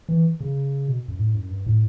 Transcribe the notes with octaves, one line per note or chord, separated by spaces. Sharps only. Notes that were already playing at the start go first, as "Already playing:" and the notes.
E3
C#3
B2
F#2
A2
F#2
G2
A2